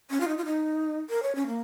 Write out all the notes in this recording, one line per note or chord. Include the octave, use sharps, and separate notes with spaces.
C#4
F4
D#4
F4
D#4
A#4
C#5
C#4
A#3